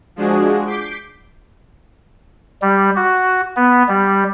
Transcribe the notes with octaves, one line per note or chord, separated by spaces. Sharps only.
F3 G#3 D4 F#4 G#4
D6 G6 B6 C7 D7
G3
F#4
B3
G3